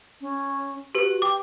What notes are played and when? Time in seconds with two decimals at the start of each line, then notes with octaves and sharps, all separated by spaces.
0.21 C#4
0.95 F#4 G4 B4
1.22 G5 D6